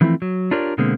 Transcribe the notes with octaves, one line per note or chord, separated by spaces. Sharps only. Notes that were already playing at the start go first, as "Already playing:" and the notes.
D3 E3 F3 A3 C4 E4
F#3
D4 F4 G4 A#4 C#5 D5
B2 D3 G#3 A#3 C4